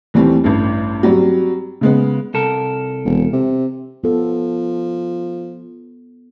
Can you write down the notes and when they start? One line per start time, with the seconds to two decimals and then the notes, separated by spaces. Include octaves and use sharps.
0.14 D#2 E3 G3 A3 C4
0.44 A1 G2
1.03 F#3 G3 C4
1.81 C#3 G#3 B3
2.34 C2 A4 A#4
3.05 E1
3.32 C3
4.04 F3 B3 A4